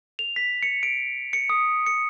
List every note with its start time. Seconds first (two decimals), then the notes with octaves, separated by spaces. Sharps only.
0.19 F7
0.36 B6
0.63 C#7
0.83 D7
1.33 C#7
1.50 D#6
1.86 C#7